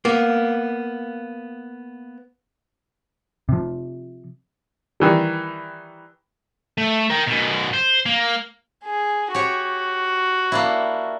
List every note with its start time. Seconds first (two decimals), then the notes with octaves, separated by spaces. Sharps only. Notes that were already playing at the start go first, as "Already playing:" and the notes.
0.05 A#3 B3
3.49 C3 F3
5.00 D#3 E3 G3
6.78 A3
7.10 A#4 G5
7.27 F#2 B2
7.73 C5
8.06 A#3
8.84 G#4
9.35 F#4 G4 C#5
10.52 A#3 D4 E4